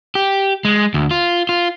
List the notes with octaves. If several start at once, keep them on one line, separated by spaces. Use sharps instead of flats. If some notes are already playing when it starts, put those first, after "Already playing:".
G4
G#3
D2
F4
F4